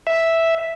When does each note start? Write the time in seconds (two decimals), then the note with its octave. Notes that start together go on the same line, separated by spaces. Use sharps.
0.07 E5